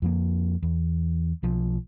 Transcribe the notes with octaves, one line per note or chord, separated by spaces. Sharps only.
F2 F3 A#3
E2
B1 F3